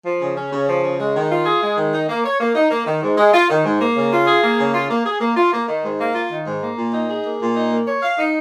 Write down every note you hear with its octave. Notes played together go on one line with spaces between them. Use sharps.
F3
C#3
C#4
C#3
F3
C#3
G#3
D#3
F4
G#4
G#3
D#3
D#4
A#3
C#5
A#3
D#4
A#3
D#3
G#2
G#3
F4
D#3
G#2
A#3
C#3
F4
G#4
A#3
C#3
F4
A#3
G#4
A#3
F4
A#3
D#3
G#2
A#3
F4
D#3
G#2
A#3
A#2
D#4
G#4
A#3
A#2
D#4
A#3
C#5
F5
D#4